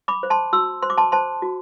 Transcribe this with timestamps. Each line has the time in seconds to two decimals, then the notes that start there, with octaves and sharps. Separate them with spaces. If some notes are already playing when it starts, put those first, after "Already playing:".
0.08 B5 D6
0.23 C5
0.30 A5 C6
0.53 F#4 C6 E6
0.83 C5 C6
0.90 D6
0.98 A5 C6
1.12 C5 A5 C6
1.42 F#4